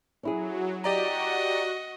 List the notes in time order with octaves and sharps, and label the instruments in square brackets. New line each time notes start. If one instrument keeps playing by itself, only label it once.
[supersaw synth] F#3 [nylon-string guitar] C#4 E4 G#4
[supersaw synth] F#4 [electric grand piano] G4 D5 A#5 [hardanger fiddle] D#5